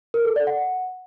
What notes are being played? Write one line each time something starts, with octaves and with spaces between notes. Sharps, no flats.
A#4
A4
D5
F#5